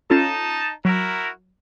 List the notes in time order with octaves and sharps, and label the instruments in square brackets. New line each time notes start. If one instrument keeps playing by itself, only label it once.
[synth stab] C#4 F4 A4 [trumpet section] D#4 A5
[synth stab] F#3 [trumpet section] E4 F#4 A#4